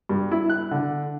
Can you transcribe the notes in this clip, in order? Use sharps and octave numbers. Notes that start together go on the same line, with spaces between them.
G2
E4
F#6
D3